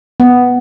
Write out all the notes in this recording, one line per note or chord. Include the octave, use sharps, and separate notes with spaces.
B3